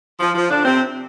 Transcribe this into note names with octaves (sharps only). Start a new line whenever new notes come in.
F3
F3
D3 D4
C3 C4